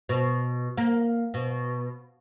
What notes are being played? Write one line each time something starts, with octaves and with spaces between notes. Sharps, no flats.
B2
A#3
B2